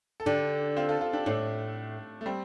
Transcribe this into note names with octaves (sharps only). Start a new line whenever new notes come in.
A4
D3 D4 G4
C4 F4
F4 A4
F4 A4
D4 G4
A2 A3 D4
A3
G3 C4